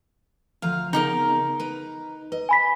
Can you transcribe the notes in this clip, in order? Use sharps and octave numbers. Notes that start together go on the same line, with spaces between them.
D2 F3 F5 A#5
C#3 B3 D#4 G4 A#4
B4 A#5
B4 D#5
G#5 B5 B6